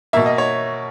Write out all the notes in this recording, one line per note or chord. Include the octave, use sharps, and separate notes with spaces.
B2 A#3 E5
D#5
C#5